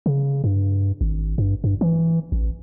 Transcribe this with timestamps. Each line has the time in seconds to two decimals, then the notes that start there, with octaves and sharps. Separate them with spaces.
0.06 C#3
0.44 G2
1.01 G#1
1.38 G2
1.64 G2
1.81 E3
2.32 A1